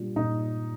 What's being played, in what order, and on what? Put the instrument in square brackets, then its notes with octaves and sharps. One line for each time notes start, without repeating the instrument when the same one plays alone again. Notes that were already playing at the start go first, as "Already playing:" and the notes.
Already playing: [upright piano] A#2 G3 D4 F4
[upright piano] A#2 [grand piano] D#4